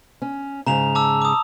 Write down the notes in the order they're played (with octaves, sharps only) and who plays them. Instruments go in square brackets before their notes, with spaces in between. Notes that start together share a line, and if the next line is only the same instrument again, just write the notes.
[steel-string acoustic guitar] C#4
[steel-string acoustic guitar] G#2 C#3 [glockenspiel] A#5 E7 F7
[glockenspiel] A5 D6 E6
D6 D#6